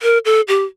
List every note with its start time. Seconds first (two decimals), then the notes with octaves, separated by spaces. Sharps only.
0.02 A#4
0.25 A4
0.48 G4